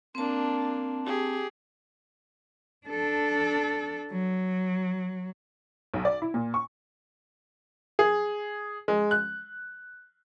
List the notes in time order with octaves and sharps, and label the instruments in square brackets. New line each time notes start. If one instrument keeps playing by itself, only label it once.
[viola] A#3 D4 [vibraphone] C4 A5
[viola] G4 G#4
[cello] D4 A4
F#3
[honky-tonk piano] B1
D5
E4
A#2
C#6
[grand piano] G#4
G#3
F#6